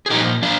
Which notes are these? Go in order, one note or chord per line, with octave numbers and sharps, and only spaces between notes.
G#4
A#2 F3 D#4 G4
D4 F4